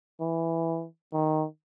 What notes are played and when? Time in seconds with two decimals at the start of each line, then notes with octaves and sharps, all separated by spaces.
0.20 E3
1.13 D#3